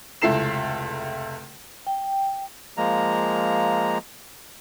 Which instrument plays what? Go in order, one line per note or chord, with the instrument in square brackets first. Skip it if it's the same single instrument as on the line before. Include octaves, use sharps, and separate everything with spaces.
[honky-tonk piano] F1 C#2 E4 A4 C7 E7
[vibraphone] G5
[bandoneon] F3 G#3 A#3 A#5